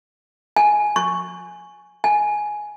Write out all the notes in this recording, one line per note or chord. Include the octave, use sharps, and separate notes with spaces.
G#5
C#6
G#5